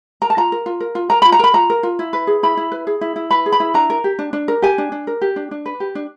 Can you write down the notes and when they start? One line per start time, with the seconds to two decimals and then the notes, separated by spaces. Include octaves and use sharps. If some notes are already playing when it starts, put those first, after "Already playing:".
0.22 A#4 A#5
0.30 A5
0.37 F4 A#5
0.52 A#4
0.66 F4
0.80 A#4
0.95 F4
1.10 A#4 A#5
1.22 F4 B5
1.32 A#5
1.39 A#4 B5
1.54 F4 A#5
1.70 A#4
1.83 F4
1.99 E4
2.13 B4
2.27 G#4
2.43 E4 B5
2.57 E4
2.72 B4
2.87 G#4
3.01 E4
3.16 E4
3.31 B4 B5
3.46 G#4
3.52 B5
3.60 E4
3.74 D4 A#5
3.90 A#4
4.04 G4
4.19 D4
4.33 D4
4.48 A#4
4.62 G4 G#5
4.78 D4
4.92 D4
5.07 A#4
5.22 G4
5.36 D4
5.51 D4
5.66 B4
5.80 G4
5.95 D4